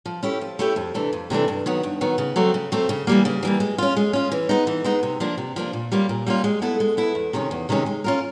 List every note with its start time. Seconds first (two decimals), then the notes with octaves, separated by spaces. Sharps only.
0.06 F3
0.23 A3 C#4 E4 G4
0.41 F3
0.59 A3 C#4 E4 G4
0.76 F2
0.94 C3 E3 A3 D4
1.13 F2
1.30 C3 E3 A3 D4
1.48 G2
1.66 D#3 F#3 B3
1.83 G2
2.01 D#3 F#3 B3
2.18 C#3
2.36 F#3 A3 C4
2.54 C#3
2.72 F#3 A3 C4
2.89 C#3
3.07 E3 G3 A#3
3.25 C#3
3.43 E3 G3 A#3
3.60 G#3
3.78 C#4 F4
3.97 G#3
4.13 C#4 F4
4.32 E3
4.49 G#3 B3 D#4
4.67 E3
4.84 G#3 B3 D#4
5.03 C3
5.20 F3 A#3 D4
5.38 C3
5.56 F3 A#3 D4
5.73 A#2
5.92 G3 A#3 C#4 F4
6.09 A#2
6.27 G3 A#3 C#4 F4
6.44 G#3
6.62 B3 E4 A4
6.80 G#3
6.97 B3 E4 A4
7.15 E2
7.33 C3 D#3 G#3 C#4
7.51 E2
7.69 C3 D#3 G#3 C#4
7.86 G#3
8.04 C#4 F4 A#4